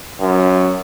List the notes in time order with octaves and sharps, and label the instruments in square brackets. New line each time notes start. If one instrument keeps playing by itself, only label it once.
[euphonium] F#2